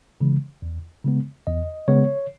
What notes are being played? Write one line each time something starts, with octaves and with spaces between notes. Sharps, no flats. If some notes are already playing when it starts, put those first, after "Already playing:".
C#3 E3 G#3
E2
C#3 G#3 B3
E2 D#5
C#3 G#3 B3 C#5